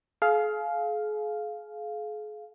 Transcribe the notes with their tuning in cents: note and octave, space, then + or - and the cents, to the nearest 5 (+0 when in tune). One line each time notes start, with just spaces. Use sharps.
G#4 +40 F5 +0